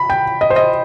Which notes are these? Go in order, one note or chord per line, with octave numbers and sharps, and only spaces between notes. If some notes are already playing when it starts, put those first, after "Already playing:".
Already playing: B5
G5
D#5
C5
D#5